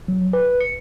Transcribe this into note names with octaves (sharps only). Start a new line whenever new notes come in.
F#3
B4
C#7